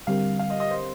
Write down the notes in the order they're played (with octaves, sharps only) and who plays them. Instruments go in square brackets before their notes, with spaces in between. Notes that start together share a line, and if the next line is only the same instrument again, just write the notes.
[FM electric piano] D3 G3 C4 G4 A#4 [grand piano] F5
[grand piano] F5
D#5
D#5
C5